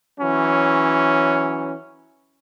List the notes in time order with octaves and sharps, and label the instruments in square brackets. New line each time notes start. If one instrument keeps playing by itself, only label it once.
[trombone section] E3 F#3 C#4